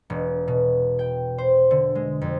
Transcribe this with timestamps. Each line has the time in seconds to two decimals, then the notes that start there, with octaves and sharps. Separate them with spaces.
0.10 E1
0.48 B2
0.99 G5
1.38 C5
1.71 D3
1.95 G#3
2.21 F2